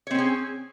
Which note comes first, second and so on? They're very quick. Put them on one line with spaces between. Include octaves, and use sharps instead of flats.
C#5 C4 C#4 G#4